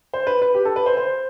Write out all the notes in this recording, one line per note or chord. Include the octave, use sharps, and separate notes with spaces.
C5
B4
B4
G4
A4
B4
C5
C5